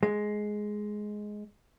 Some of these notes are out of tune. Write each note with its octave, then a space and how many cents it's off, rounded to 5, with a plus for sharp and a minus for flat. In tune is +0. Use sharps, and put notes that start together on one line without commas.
G#3 +10